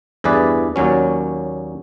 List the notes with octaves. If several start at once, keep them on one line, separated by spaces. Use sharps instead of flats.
E2 G2 E3 G#4 B4 D5
D#2 A#2 F#3 C#4